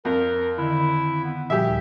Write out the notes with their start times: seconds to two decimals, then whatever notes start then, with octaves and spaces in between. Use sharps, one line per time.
0.05 F2 A#4
0.58 D3 D#3 E4
1.24 B3
1.50 A#2 F3 G3 G4 G#4 E5
1.64 D#2 G5